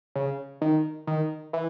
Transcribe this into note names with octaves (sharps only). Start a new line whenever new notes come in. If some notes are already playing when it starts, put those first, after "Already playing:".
C#3
D#3
D#3
E3